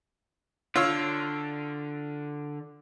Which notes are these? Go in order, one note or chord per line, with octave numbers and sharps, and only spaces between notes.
D3 F4 C#5 E6